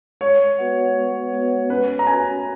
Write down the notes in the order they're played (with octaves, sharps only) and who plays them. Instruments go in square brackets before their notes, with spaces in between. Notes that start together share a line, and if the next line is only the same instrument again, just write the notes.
[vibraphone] G#3 [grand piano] C#5
[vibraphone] B3 F#4 B4 F#5
G#3
B3 F#4 B4 F#5
[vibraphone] C#4 [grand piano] B4
[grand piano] A#5
[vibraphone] F#4 B4 [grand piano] G#5